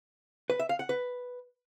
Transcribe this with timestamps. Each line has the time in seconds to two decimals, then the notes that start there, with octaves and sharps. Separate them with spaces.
0.50 B4
0.59 E5
0.69 F5
0.79 F#5
0.89 B4